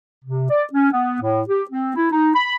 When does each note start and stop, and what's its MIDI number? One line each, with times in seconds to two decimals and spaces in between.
0.24 0.49 48
0.50 0.64 74
0.73 0.92 61
0.92 1.16 59
1.22 1.42 45
1.48 1.63 67
1.70 1.95 60
1.96 2.07 64
2.12 2.30 63
2.34 2.56 83